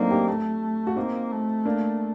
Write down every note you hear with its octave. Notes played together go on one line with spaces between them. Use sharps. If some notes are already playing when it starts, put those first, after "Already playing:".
Already playing: F#3 A3 A#3 C4 D4 D#4
D#4 G4
A3
F#4
A#3 C4 D#4
A3
A#3 D4